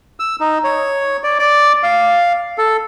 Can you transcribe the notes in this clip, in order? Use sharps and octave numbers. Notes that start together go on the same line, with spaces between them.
E6
D#4
C#5
D5
D5
F5
A4